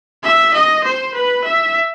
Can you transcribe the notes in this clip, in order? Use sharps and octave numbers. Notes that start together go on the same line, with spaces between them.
E5
D#5
C5
B4
E5